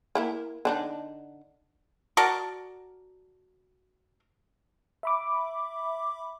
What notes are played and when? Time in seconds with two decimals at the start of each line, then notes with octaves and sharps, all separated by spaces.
0.15 A#3 E4 A#4
0.65 D3 D4 D#4
2.17 F#4 A#4 D5 A5
5.03 E5 B5 D6